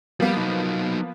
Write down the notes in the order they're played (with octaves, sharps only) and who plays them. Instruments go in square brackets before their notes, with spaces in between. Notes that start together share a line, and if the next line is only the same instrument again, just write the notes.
[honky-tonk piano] F3 A#3 B3 [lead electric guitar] G3
[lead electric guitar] F#3 D#4